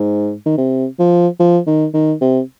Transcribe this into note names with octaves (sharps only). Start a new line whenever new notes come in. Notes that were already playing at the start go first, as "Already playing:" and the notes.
Already playing: G#2
D#3
C3
F3
F3
D#3
D#3
C3